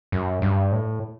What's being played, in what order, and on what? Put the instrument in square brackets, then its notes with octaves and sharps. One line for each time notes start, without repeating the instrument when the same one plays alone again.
[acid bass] F#2
G2
A2